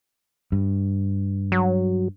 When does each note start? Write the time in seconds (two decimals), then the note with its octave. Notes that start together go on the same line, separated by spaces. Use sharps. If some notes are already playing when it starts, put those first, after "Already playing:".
0.52 G2
1.52 F#3